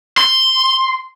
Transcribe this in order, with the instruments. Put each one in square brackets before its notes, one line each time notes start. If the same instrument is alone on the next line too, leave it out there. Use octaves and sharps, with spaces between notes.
[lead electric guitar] C6